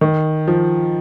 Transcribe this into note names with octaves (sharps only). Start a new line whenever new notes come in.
D#3
F3